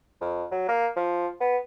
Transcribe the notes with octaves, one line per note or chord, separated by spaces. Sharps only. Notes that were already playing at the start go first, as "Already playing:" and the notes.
F2
F#3
A#3
F3
B3